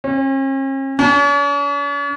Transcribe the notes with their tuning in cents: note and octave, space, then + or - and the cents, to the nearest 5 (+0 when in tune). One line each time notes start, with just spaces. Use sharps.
C#4 -45
C#4 +45